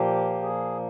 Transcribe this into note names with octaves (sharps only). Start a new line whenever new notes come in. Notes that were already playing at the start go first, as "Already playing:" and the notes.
Already playing: A#2 F3 A#3 G4
G#4